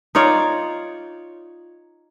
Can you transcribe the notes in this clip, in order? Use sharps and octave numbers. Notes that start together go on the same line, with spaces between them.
D#4 F4 C#5 D5